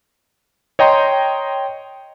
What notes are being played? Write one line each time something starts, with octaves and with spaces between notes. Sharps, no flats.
C#5 D#5 G5 A#5 C6